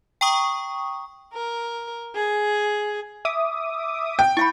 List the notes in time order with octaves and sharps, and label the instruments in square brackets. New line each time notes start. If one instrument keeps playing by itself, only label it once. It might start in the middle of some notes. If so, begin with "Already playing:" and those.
[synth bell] G5 A#5 C#6 D#6
[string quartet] A#4
G#4
[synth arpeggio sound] E5 D6 D#6
[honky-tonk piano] G5
[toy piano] E4 F5 B5 [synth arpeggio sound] C#6